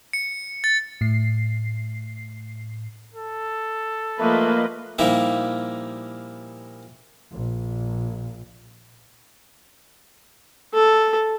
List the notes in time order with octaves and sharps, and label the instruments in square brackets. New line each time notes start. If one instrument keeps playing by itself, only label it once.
[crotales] C#7
A6
[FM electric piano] A2 C7
[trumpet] A4
[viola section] F3 B4 D#5 [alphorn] A3 [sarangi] A#3
[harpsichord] A#2 F3 G3 A#3 D#4 E4
[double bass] A#1
[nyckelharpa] A4